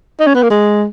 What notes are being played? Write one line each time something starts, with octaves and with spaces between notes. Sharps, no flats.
D#4
C#4
B3
A#3
G#3